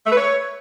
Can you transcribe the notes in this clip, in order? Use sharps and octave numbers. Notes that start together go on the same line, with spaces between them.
A3
B4
C#5